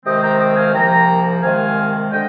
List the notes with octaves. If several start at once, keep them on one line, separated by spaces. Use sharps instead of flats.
C2 C3 D#3 G#3 C4 D#5 G5
G5 A#5
D#5 G5
F5 G#5
C2 C3 F3 A#3 G5 A#5
C2 C3 D#3 G#3 C4 F5 G#5
D3 G#3 D#5 G5